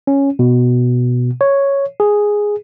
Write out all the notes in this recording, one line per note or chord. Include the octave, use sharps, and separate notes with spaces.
C#4
B2
C#5
G#4